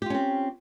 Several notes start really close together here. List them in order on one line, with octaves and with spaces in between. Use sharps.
G4 F4 C#4 C4